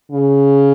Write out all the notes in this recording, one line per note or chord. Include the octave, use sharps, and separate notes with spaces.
C#3